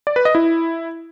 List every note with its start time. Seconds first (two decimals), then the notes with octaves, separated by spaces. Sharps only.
0.07 D5
0.16 B4
0.25 D#5
0.35 E4